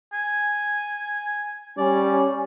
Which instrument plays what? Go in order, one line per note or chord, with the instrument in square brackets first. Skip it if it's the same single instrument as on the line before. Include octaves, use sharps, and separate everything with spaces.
[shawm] G#5
[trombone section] G3 C#4 [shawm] D5